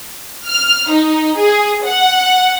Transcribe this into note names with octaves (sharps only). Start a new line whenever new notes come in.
F6
D#4
G#4
F#5